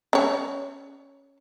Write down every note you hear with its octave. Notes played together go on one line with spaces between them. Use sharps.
C#4 C#5